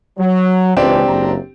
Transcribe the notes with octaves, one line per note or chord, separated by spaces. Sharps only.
F#3
C#2 A#2 E3 C4 D4 G4
F#1 C#2 A#5